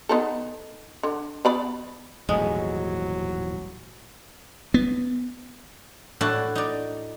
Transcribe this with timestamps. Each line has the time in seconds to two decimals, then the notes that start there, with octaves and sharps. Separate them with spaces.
0.09 B3 D#4 A4
1.03 D3
1.45 B3 D5 B5
2.29 D#1 A1 G#2 F#3 G#3
4.74 B3
6.21 A2 D4 E4 F#4 A5
6.55 D#4 D5